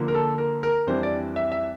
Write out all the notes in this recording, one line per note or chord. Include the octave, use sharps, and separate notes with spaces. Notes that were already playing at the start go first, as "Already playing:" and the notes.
Already playing: D3 F3 A#3
A#4
A4
A#4
A#4
F2 E3 G3 D4 C5
D5
E5
E5